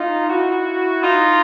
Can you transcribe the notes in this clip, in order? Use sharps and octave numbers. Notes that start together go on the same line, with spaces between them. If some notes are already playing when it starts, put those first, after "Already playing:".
Already playing: D#4 F4
E4 F#4
D#4 F4